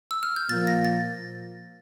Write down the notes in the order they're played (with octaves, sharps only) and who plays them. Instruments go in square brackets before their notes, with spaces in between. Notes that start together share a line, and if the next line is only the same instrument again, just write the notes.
[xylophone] E6
F6
G6
[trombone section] A#2 F3 A#3 [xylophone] A6
[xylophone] A#6
A6